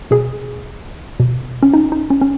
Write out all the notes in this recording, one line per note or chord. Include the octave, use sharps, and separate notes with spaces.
B2 G#4
B2
C#4
D#4
D#4
C#4
C#4